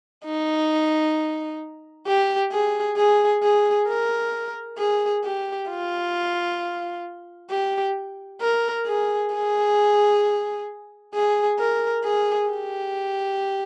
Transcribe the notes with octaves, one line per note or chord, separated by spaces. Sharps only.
D#4
G4
G#4
G#4
G#4
A#4
G#4
G4
F4
G4
A#4
G#4
G#4
G#4
A#4
G#4
G4